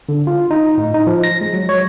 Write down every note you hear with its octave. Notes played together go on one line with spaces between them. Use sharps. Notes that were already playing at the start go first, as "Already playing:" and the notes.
D3
F4
D#4
A2
D#4
F3
A#6
G#3
F#3
C#5